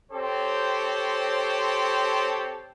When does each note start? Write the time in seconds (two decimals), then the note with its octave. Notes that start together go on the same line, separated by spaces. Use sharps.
0.11 C4 G4 A4 C5 C#5